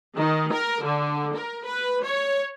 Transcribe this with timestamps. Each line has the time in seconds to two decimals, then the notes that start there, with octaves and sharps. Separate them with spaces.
0.16 D#3
0.52 A#4
0.84 D3
1.35 A#4
1.64 B4
2.03 C#5